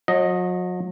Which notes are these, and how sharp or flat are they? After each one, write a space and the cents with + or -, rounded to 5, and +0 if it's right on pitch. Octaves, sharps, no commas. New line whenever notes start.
F#3 -40 D#5 +0